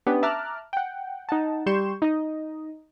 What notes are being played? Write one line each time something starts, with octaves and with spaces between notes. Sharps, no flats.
B3 C#4 D4 G4
E5 A5 A#5 D6 F6 F#6
F#5 G5
D#4 F#5 A5
G3 G4 C6 C#6 G6 E7
D#4 D#5